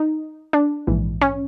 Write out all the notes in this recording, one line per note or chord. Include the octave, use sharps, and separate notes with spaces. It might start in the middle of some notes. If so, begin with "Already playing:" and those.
Already playing: D#4
D4
A#1 G#2 E3
C#4